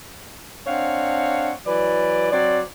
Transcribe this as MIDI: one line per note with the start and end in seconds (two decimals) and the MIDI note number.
0.67 1.51 60
0.67 1.51 62
0.67 1.51 73
0.67 1.51 77
0.67 1.51 78
1.67 2.32 52
1.67 2.32 54
1.67 2.32 71
1.67 2.32 74
2.32 2.60 54
2.32 2.60 60
2.32 2.60 72
2.32 2.60 74